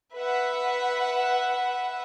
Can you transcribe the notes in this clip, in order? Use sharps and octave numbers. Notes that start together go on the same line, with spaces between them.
B4 E5 F#5